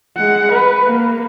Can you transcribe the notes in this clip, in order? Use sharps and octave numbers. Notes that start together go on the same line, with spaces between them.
G#3 F#5
B4
A#3